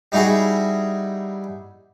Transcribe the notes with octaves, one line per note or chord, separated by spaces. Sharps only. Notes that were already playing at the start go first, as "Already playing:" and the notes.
G3 D#4 E4 F#4 G#4